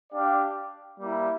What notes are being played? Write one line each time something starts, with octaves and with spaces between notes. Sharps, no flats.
D4 G4 D5 F5
G3 A#3 E4